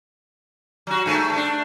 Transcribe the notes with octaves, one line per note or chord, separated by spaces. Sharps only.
F#3 F#4
G2 A3
A3 D4